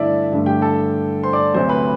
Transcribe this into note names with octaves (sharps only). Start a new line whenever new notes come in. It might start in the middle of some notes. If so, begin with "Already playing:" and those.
Already playing: G2 D3 A3 D4 E4 A4 D5 E5
G2 D3 A3
G4 G5
A4 A5
C5 C6
D5 D6
D2 C3 F#3 C5 C6
B4 B5